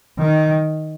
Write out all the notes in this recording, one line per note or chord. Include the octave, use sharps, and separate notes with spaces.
D#3